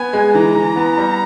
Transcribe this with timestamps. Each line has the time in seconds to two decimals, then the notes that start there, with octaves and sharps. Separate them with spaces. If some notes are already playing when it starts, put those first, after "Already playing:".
Already playing: B3 G#5
0.13 G#3
0.34 E3 A#5
0.55 E3
0.76 B3
0.98 G3